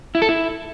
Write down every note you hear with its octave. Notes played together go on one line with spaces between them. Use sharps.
E4
A4
E4